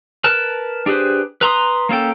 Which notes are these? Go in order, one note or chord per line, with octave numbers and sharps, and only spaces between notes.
A#4 B4 A5
D4 G4 G#4 B4 C5
B4 A#5 C6 D#6
A#3 C#4 A4 G5